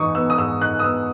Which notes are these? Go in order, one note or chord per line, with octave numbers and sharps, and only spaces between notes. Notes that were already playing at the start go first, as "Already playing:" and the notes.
Already playing: G#2 E3 D#4 C#6 D#6
B3 E6
D#6
G#2 E6
D#4 F#6
D#6
B3 E6